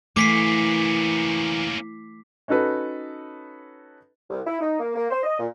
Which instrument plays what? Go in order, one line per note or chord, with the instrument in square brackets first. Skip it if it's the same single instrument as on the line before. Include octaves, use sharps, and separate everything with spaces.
[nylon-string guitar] E3 [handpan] A3 [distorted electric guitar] A#3 C#4 [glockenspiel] D6 B6 C7
[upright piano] C#4 D#4 F#4 A4 B4
[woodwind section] C2
E4
D#4
A#3
A#3
C5
D#5
A#2